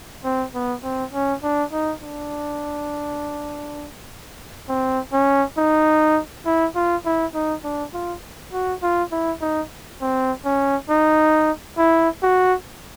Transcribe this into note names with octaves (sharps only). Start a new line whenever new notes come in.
C4
B3
C4
C#4
D4
D#4
D4
C4
C#4
D#4
E4
F4
E4
D#4
D4
F4
F#4
F4
E4
D#4
C4
C#4
D#4
E4
F#4